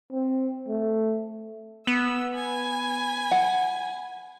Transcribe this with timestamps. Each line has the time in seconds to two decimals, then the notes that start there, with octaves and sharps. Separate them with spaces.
0.12 C4
0.68 A3
1.87 B3 E6
2.35 G#5 B5
3.31 F#5